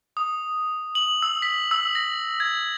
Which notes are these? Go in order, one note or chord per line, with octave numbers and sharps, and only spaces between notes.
D#6
F#7
E6
B6
E6
A#6
G#6